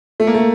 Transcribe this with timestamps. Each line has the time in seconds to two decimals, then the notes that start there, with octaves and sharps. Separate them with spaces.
0.20 A3
0.27 A#3
0.34 A3